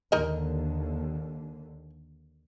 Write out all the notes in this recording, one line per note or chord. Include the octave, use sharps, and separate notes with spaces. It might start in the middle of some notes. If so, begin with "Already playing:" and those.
D#2 D3 D#4 A#4 D#5